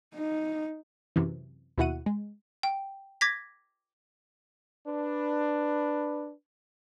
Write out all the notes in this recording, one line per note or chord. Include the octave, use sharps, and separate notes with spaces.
D#4
F#2 C3 E3
D#2 B2 E4 F#4 F#5 D#7
G#3
G5
D6 G#6 A#6 B6
D4 B4